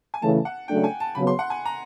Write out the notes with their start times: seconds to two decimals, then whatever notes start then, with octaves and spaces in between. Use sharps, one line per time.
0.14 G#5
0.21 C#3 E3 A3 A5
0.45 F#5
0.68 C#3 F#3 A3 D4 G5
0.84 G#5
1.00 A5
1.15 C#3 F#3 B3 B5
1.27 C6
1.39 F#5
1.50 G#5
1.66 A#5